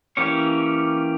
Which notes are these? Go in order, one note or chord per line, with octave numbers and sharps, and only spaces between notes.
E3 A#3 C#4 G4 C#5